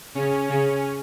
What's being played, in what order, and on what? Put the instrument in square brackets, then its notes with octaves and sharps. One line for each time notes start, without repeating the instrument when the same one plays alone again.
[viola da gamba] C#3 [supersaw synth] C#4
[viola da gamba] C#3